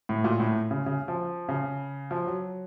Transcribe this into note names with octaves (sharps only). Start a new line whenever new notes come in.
A2
A#2
A2
C#3
C#3
F3
C#3
F3
F#3